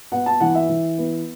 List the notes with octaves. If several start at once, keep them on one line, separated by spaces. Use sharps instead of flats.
B3 F#5
A5
E3 F#5
E5
E3
B3